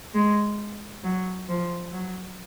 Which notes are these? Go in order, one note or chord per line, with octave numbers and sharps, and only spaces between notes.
G#3
F#3
F3
F#3